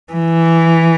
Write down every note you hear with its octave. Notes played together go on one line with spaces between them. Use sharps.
E3